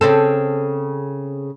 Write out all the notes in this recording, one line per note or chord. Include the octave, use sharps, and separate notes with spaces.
C#3 C4 A4